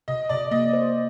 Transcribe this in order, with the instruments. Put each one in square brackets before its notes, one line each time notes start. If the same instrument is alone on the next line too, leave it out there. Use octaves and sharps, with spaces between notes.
[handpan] C3 [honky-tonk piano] D#5
[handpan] C3 [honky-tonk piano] D5
[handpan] A#3 [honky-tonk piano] D#5
[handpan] C5